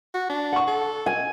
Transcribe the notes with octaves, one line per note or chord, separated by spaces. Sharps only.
F#4
D4
F#5 C#6
A4
G#5